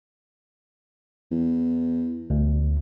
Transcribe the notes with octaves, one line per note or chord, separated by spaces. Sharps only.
E2
D2